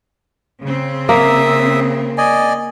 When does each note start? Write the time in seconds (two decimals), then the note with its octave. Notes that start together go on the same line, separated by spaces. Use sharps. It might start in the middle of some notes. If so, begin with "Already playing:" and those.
0.61 C#3 C4
1.09 A#3 E5 D#6 E6
2.18 D5 D#5 G#5